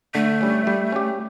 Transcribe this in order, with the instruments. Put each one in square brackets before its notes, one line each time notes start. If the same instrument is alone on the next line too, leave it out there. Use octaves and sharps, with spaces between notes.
[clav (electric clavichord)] D3 [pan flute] A3
[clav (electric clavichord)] G3 C#4
G3
C#4 G4